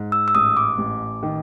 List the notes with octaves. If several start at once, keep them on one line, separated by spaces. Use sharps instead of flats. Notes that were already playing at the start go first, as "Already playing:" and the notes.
Already playing: G#2
E6
E6
A1 D#6
D6
A1
D#3